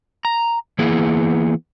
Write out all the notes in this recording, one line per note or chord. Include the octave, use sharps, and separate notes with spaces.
A#5
E3 A#3 B3 E4 G#4